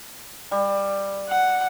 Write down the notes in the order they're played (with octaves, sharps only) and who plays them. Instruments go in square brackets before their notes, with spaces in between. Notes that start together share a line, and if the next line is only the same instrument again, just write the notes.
[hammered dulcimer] G3
[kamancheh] F#5